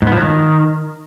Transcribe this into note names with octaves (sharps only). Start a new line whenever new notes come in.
G#2
B3
F3
F#3
D#3